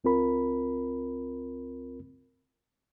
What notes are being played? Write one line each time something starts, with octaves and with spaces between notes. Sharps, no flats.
C#2 C4 F4 A#4 B5